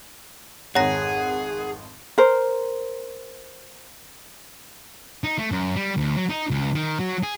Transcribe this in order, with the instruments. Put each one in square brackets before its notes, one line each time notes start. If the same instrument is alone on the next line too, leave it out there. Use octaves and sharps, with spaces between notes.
[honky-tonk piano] G#1 F2 D#3 [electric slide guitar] G#4 [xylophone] C#5 A#5 A#6 [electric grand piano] F#5
[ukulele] A#4 C5
[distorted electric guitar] D#4
A3
F#2
G3
D2
F#3
D#4
C#2
D#3
F#3
G#4